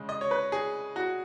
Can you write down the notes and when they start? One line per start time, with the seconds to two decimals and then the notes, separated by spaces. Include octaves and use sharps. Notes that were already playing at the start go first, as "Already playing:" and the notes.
Already playing: C#3 G#3
0.09 D#5
0.21 C#5
0.31 B4
0.52 G#4
0.96 F#4